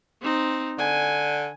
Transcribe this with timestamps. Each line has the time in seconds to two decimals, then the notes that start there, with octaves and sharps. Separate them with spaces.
0.22 C4 D#4
0.79 D3 G#5